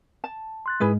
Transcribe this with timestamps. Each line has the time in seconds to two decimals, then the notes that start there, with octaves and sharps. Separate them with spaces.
0.24 A5
0.66 C6 F#6 A6
0.80 G#2 G#3 E4 G#4 B4